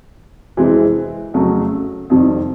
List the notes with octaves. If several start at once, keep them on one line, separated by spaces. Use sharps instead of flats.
F2 C3 E3 G#3 C4
F2 C#3 F#3 A3
F2 C3 D#3 G3 C4